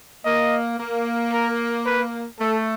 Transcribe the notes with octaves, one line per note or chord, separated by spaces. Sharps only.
A#3 D#5
A#3
A#4
B4
A3 A4